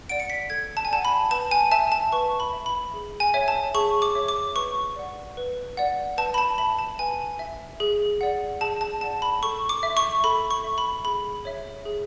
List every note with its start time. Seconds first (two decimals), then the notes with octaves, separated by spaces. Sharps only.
0.09 D5 F#5 D7
0.20 C#7
0.30 B6
0.50 A4 G#6
0.77 A5
0.85 G#5
0.90 D5 F#5 A5
1.05 B5
1.31 B4 A5
1.51 G#5
1.71 E5 A5
1.92 A5
2.12 B4 C#6
2.40 B5
2.53 E5
2.66 B5
2.94 G#4
3.20 G#5
3.34 C#5 E5
3.48 A5
3.74 G#4 C#6
4.02 D6
4.15 C#5 E5
4.28 D6
4.55 B4 C#6
4.96 D5 F#5
5.37 B4
5.77 D5 F#5
6.18 B4 A5
6.34 B5
6.38 A5
6.58 E5 B5
6.79 A5
6.99 B4 G#5
7.39 E5
7.80 G#4
8.21 D5 F#5
8.61 G#4 A5
8.81 A5
9.01 D5 F#5 A5
9.22 B5
9.43 A4 C#6
9.69 D6
9.83 E5
9.97 C#6
10.24 A4 B5
10.51 C#6
10.64 E5
10.78 B5
11.04 G#4 B5
11.45 C#5 E5
11.85 G#4